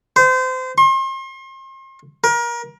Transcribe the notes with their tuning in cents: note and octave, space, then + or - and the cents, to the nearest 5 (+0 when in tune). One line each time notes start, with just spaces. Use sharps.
C5 -30
C6 +40
A#4 +30